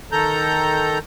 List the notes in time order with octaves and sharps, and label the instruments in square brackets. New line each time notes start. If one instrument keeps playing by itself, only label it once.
[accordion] D#3 A4 A#5 G6